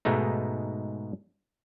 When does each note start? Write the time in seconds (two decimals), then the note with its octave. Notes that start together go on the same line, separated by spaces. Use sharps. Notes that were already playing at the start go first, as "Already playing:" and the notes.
0.05 G#2 B2 G#3 A3 D#4